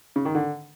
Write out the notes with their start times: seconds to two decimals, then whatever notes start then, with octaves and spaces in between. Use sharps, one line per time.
0.16 C#3
0.25 D#3
0.35 D3